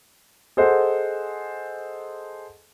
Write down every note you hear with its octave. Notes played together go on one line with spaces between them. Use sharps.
G#4 A4 C5 D#5 F#5